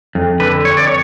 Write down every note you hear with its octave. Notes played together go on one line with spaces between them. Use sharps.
F2
D3 B4
F2 C#5
D5
C#5